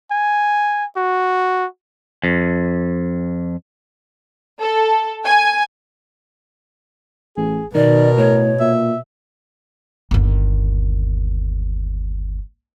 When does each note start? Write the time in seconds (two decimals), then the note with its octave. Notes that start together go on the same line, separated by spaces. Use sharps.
0.11 G#5
0.97 F#4
2.24 F2
4.60 A4
5.25 G#5
7.37 A1 G#4
7.75 B2 D#3 A#4 D5
8.17 A2 C#5
8.60 A#2 E5
10.11 G1 D#2